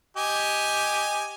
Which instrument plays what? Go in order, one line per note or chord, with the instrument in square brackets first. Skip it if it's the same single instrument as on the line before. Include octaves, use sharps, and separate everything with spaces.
[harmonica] G4 D#5 G#5